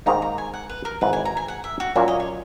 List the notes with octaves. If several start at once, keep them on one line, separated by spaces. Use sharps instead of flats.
G#2 D#3 A#3 D#4 A#5
A#5
G#5
F#5
B4
A#4
G#1 G#2 E3 B4
G#5
A#5
G#5
F#5
E5
F#4
A#2 F#3 A#3 C#4 E4
D#5
C#5